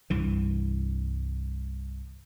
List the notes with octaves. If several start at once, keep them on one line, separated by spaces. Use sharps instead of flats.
C2 G2 E3